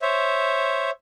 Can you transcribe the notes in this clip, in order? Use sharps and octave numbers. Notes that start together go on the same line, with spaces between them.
C5 C#5 E5